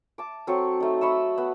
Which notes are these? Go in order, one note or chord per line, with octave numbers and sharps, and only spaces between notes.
A5 D6
F#3 C4 A4 C#6
A3 D#4
D#5 B5 C#6 E6
B3